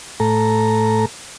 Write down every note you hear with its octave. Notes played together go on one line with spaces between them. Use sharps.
A2 A4 A#5